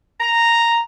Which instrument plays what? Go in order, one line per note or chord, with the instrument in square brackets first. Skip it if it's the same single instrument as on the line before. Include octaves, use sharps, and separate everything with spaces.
[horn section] A#5